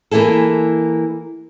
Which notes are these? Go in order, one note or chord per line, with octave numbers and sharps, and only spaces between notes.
E3 A#3 E4 G#4 A4